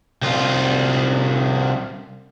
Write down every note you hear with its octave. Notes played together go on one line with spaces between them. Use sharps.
C2 F4